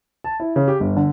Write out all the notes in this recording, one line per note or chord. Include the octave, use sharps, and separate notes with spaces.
A5
E4
C#3
G4
G1
D3